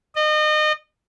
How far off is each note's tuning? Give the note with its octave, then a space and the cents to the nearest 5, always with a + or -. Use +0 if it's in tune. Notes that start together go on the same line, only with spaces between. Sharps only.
D#5 -30